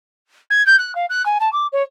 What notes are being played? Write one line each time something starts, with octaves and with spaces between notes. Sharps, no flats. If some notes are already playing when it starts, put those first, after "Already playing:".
G#6
G6
F#6
F5
F#6
G#5
A5
D6
C#5